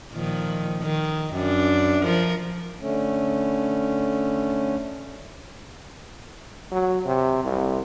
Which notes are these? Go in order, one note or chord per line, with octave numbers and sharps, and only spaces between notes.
A#2 D#3 F3
D#3
F#2 D4
F3 A#4
D3 A3 C#4
F#3
C3
C2